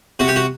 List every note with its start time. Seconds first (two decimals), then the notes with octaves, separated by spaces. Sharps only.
0.19 C3 F#4
0.28 G4
0.36 F#4